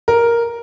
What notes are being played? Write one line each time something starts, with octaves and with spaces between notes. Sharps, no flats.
A#4